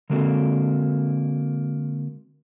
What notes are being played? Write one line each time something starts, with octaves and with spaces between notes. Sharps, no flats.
D3 G#3 A#3 C4 F#4 A4